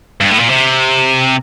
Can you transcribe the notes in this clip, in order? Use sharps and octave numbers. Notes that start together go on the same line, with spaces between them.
G2
A2
A#2
C3